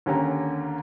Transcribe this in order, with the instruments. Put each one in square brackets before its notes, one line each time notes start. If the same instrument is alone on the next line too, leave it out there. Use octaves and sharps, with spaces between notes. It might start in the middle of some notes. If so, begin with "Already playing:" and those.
[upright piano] D#2 D3 C#4 G4 A#5